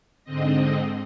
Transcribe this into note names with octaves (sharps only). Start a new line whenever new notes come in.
G#2 D3 C4 D#5